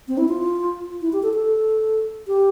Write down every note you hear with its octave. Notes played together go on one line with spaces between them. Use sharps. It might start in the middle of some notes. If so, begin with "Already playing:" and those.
C4
E4
F4
E4
G4
A4
A4
G4